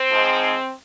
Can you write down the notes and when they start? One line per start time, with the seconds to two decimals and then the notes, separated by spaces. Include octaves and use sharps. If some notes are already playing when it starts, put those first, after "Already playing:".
Already playing: C4
0.11 G#2 F3 G#3